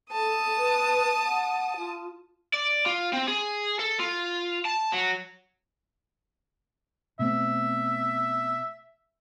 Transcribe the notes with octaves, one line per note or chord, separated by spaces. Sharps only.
A4 A5 D#6
B4
F#5
F4
D5
F4
C4
G#4
A4
F4
A5
F#3
B2 A3 C4 E5